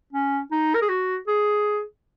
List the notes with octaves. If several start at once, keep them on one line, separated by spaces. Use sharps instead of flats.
C#4
D#4
A#4
G#4
F#4
G#4